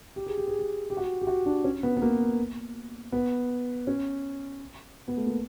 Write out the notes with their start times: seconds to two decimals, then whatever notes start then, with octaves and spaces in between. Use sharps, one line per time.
0.16 G4
0.26 G#4
0.38 G4
0.48 G#4
0.59 G4
0.90 G4
0.97 F#4
1.04 G4
1.22 G4
1.27 F#4
1.46 D4
1.64 C#4
1.83 B3
1.97 B3
2.02 A#3
3.12 B3
3.87 C#4
5.08 B3
5.17 A3
5.26 A#3